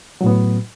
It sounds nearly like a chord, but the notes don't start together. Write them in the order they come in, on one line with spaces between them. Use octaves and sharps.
F#3 A2 B3